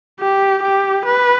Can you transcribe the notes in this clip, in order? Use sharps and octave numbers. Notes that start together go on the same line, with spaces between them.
G4
G4
B4